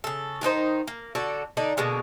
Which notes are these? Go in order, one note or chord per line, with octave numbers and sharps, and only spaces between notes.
C#3 A4
D#3 D4 D#4 C5
A#3
D3 F#4 A4 D5
D3 D4 D#4
B2 D3 G#3 A#3